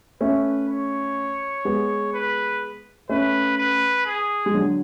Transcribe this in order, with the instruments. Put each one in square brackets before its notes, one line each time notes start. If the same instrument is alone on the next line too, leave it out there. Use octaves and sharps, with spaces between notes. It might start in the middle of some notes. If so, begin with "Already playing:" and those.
[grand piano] A3 C#4 [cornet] B4
[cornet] C#5
[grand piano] G#3 B3
[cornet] B4
[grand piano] A3 C#4 [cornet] B4
[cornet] B4
G#4
[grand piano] G#3
D3 F#3